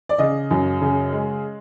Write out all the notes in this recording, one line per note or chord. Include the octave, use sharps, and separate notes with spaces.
D5
C#3 D#5
F#2
C#3
G#3